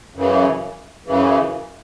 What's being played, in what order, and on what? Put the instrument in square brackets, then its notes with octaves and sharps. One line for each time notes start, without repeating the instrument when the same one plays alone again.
[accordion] F#2 C#3 E3
F#2 C#3 E3